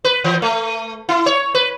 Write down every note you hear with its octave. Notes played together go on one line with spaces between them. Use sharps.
B4
E3
A3
E4
C#5
B4